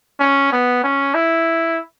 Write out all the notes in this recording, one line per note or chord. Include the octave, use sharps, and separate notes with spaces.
C#4
B3
C#4
E4